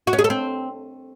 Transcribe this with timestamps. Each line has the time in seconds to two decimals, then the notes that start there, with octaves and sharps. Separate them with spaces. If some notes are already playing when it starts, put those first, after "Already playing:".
0.07 F#4
0.13 C#4
0.19 G#4
0.24 A4
0.30 C4